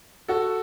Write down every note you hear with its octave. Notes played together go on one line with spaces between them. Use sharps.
F#4 A4